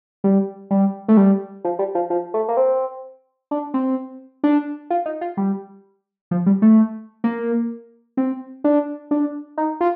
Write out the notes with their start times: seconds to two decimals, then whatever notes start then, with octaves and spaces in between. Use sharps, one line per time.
0.24 G3
0.71 G3
1.08 A3
1.17 G3
1.64 F3
1.79 G3
1.95 F3
2.10 F3
2.34 A3
2.48 A#3
2.57 C4
3.51 D4
3.74 C4
4.44 D4
4.90 F4
5.06 D#4
5.21 F4
5.37 G3
6.31 F3
6.46 G3
6.62 A3
7.24 A#3
8.17 C4
8.64 D4
9.11 D4
9.57 D#4
9.81 F4